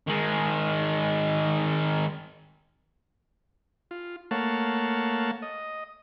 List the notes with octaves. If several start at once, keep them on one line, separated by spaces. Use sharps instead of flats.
D#3 G#3
F4
A3 A#3 C#5 F5 F#5 A5
D#5